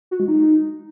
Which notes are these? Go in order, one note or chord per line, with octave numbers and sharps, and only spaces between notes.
F#4
G#3
D#4